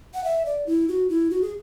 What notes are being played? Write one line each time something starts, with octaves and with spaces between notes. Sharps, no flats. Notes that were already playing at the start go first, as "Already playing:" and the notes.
F#5
E5
D5
E4
F#4
E4
F#4
G#4